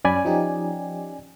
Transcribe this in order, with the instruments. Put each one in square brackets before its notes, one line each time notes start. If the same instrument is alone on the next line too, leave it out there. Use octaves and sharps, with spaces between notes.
[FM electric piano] F#2 B5 [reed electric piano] C#4 D5 G#5
[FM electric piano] F3 D#4 G4